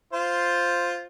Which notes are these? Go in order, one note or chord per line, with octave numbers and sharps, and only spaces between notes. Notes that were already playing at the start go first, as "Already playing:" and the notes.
F4 C5